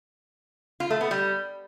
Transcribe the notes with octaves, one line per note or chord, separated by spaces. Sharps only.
F4
A3
B3
G3